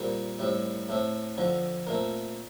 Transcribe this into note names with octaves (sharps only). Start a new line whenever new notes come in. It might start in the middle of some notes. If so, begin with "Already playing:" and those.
Already playing: A#2 G3 C4 A#4
A2 G3 C4
A2 A3 C4
F2 D3 F3
A#2 A3 C4 A#4